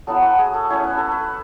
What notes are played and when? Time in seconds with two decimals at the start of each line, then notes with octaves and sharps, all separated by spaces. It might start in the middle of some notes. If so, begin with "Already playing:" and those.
0.07 F#3 B3 E4 A4
0.22 F#4
0.38 G#4
0.54 A4
0.70 A3 C#4 E4 C#5
0.84 B4
0.98 A4
1.11 B4